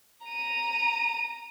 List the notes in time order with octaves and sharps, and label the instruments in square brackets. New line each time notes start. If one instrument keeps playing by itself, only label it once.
[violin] A#5 D#7